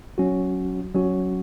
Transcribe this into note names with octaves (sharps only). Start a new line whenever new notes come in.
F#3 C#4 F#4
F#3 C#4 F#4